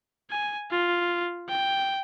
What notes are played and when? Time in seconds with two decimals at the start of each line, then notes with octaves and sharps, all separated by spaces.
0.30 G#5
0.71 F4
1.49 G5